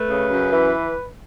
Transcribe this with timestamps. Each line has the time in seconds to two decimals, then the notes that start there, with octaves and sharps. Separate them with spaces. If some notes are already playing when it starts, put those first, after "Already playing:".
Already playing: A3 B4
0.09 C#3
0.31 F#2
0.51 E3